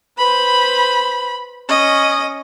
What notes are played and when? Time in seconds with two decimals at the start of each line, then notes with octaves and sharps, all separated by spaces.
0.18 B4 C5 B5
1.68 C#4 D#5